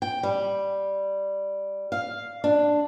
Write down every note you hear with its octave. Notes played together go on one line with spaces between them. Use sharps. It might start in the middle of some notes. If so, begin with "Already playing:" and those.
G5
G3
F5
D4